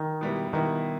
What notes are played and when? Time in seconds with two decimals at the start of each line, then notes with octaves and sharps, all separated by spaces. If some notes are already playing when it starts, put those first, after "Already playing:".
Already playing: D#3
0.21 B2 G3 B3 E4
0.53 B2 D#3 G3 B3 E4